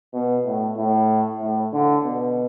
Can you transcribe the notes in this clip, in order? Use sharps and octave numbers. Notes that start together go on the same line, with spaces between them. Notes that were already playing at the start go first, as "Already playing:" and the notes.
B2
A2
A2
A2
D3
B2